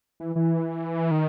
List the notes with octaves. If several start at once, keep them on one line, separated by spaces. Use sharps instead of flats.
E3
E3
D#3